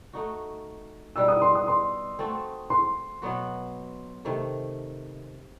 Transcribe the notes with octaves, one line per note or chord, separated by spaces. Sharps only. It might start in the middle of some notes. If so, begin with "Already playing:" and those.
A3 D#4 F#4
B2 G3 D#4 E6
D#6
C6
D#6
C6
A3 C4 F#4 A4
C6
B2 F#3 B3 F#4
C3 D#3 A3